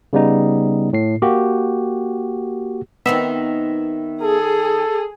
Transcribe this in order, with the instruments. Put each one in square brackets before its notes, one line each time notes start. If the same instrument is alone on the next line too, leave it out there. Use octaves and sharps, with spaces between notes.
[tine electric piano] C#3 G3 B3 D#4
A2 C7
A#3 F#4 G4
[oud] D#3 C4 D#4 [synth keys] B3 E5
[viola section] G#4 [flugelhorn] A4